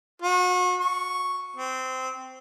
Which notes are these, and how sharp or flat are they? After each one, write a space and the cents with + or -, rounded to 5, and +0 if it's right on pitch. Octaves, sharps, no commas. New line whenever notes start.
F#4 -35
C#6 +0
C4 -15